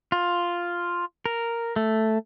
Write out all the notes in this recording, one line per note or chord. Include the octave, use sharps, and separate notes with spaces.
F4
A#4
A3